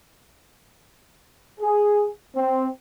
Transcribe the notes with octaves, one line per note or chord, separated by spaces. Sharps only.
G#4
C4